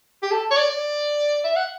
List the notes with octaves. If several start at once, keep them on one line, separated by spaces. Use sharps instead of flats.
G4
A4
C#5
D5
D5
E5
F#5